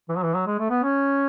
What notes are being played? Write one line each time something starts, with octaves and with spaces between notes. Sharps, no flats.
E3
F#3
E3
F#3
G#3
A3
B3
C#4